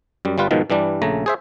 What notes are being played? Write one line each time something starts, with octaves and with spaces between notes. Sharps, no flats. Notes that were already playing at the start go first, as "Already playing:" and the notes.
F#2 G3
G1 G3 F4 B4
G#2 B2 D#3 F3
G2 E3 G3 D4
A#1 C#3 A3 A#5
G#4 C5 E5